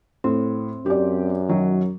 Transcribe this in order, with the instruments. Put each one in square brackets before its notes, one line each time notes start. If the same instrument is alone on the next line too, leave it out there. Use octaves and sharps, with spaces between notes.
[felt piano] A2 [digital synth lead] C4
[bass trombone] F#2 [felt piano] G4 D5
[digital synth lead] D#3 [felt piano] F#3